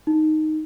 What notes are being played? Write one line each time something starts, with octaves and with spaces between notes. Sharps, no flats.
D#4